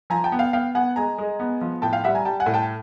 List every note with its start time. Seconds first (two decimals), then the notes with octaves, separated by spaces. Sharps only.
0.10 F3 G#5 A#5
0.24 G5 A5
0.32 B3
0.39 F5 G5
0.53 B3 F5 G5
0.75 B3 F#5 G#5
0.96 G#3 G#5 A#5
1.18 G#3
1.40 B3
1.61 F3
1.82 A2 G5 A5
1.93 F5 G5
2.04 G3 E5 F#5
2.15 G#5 A#5
2.25 G3 G5 A5
2.40 F#5 G#5
2.46 A2
2.54 G5 A5